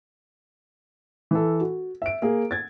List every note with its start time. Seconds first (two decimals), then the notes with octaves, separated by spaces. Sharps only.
1.31 E3 A4
1.61 F#4
2.02 E5 D7
2.22 A#3 G#4
2.51 G#6 A6